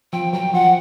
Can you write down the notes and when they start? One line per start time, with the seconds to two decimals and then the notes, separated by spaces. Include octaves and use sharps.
0.12 F3 G5
0.33 F#3 G5
0.53 F3 F#5